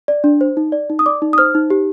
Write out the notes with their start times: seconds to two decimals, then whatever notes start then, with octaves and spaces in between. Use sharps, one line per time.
0.08 D5
0.24 D4
0.41 C5
0.57 D#4
0.72 D5
0.90 D#4
0.99 D#6
1.06 D5 D6
1.22 D#4
1.33 D#6
1.38 C5 F6
1.55 D#4
1.70 G4